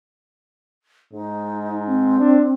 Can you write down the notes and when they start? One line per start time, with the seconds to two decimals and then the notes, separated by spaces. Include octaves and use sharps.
1.13 G#2 D#4
1.88 C4
2.19 D4